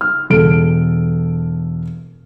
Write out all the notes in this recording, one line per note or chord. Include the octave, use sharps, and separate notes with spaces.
F6
E1 A4 D7